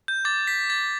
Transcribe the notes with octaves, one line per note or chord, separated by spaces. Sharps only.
G6
D6 G6 A6
B6
A6